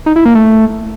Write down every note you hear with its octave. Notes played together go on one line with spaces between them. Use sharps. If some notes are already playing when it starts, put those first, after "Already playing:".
D#4
E4
A#3
A3